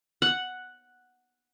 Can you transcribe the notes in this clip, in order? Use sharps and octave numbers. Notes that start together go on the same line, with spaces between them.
F#5